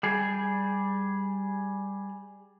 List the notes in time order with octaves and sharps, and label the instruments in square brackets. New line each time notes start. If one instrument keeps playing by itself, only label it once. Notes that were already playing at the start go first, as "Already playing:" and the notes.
[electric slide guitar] G3 G#4